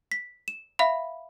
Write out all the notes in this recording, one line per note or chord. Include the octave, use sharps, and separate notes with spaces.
B6
E7
E5 F5 B5